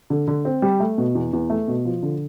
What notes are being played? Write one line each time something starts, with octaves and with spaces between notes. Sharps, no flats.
D3
D3
C4
G3
A3
B2
E2
E2
A3
B2
F3
D3